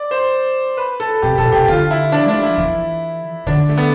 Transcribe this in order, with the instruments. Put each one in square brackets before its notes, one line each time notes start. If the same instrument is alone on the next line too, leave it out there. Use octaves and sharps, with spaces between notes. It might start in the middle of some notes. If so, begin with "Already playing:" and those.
Already playing: [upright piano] D5
C5
B4
A4
[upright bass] C3 [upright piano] G4
[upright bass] B2 [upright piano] A4
[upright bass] C3 [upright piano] G4
[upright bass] D3 [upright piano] F4
[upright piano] E4
D4
[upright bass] A3 [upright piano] D4
[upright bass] G3
[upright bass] F3 [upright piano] E4
[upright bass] E3
[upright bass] D3 [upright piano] D4
[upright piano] A3
B3